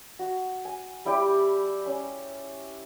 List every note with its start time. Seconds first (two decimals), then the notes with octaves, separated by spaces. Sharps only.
0.19 F#4
0.65 G#5
1.05 G3 E4 G4 D5
1.86 C#4